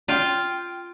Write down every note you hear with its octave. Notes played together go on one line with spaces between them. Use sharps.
F4 F5 G5